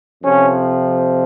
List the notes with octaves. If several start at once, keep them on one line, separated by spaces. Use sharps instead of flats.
F2 C3 F3 C#4